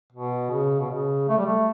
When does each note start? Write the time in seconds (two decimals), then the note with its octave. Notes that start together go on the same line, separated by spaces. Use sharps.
0.13 B2
0.50 C#3
0.80 B2
0.90 C#3
1.28 A3
1.38 G3
1.46 A3